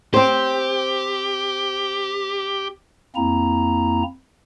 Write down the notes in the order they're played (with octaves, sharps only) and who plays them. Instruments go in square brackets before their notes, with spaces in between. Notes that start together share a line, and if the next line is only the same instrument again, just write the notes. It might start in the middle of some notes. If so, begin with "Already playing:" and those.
[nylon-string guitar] C4 C5 [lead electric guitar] G4
[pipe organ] F2 A#3 C4 E4 A#5